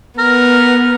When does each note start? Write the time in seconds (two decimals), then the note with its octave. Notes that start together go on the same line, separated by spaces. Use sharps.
0.19 B3 A#4